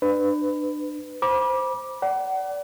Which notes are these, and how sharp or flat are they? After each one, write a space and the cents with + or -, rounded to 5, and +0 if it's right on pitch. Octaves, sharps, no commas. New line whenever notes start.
D4 +30 B4 +20
C5 +0 B5 -35 D6 +0
D5 -20 F#5 +35